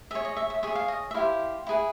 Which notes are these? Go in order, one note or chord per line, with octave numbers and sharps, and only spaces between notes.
G#4 C#5 E5
D#5
E5
E5
G#4 C#5 E5
F5
D#5
E5
E4 G4 C5 F5
E4 G#4 B4